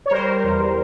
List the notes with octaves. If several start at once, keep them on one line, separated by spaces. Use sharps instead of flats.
C#5
G3 A#4 C5
G3
E2